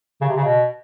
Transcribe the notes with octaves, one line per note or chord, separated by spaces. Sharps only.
C#3
C3
C#3
B2